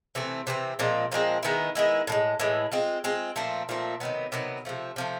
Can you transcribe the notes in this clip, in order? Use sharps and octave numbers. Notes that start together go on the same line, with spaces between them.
C3 E3 A3 C4
C3 E3 A3 C4
A#2 F3 G#3 C4
A#2 F3 G#3 C4
D#3 G#3 B3 E4
D#3 G#3 B3 E4
A2 E3 G#3
A2 E3 G#3
G#3 C4 F4
G#3 C4 F4
A#2 F3 A3 C4
A#2 F3 A3 C4
C3 D#3 F#3 B3
C3 D#3 F#3 B3
C3 F3 A3
C3 F3 A3